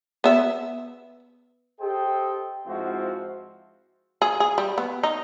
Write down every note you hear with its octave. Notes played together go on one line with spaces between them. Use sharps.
B3 E5
G4 A4 C5 D#5 G5
G#2 F3 C4 E4 F#4
G#4
G#4
G3
B3
D#4